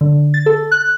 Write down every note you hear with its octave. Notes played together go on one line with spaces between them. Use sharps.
D3
A6
A4
F#6